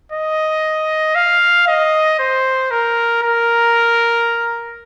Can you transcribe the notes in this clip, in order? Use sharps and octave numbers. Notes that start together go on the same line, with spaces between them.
D#5
F5
D#5
C5
A#4
A#4